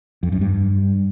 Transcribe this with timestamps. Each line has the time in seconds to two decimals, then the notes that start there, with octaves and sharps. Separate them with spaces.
0.23 F2
0.32 F#2
0.41 G2